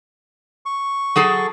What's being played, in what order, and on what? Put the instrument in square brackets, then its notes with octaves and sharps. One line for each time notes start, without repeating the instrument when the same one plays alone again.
[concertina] C#6
[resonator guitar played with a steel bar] F#3 G#4 A4